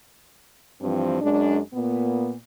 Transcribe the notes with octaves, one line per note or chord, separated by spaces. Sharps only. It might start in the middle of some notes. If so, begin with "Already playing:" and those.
G2 E3 F3 C4
F#2 G#3 D4
A#2 B3